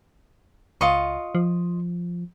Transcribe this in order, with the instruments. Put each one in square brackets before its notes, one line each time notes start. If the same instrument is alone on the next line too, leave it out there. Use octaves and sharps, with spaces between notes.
[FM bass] C#2 [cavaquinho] F4 D#5 C#6
[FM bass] F3